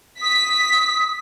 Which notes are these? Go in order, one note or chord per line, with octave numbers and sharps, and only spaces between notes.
D#6 B6